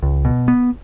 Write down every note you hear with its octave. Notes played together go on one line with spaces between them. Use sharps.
C#2
B2
B3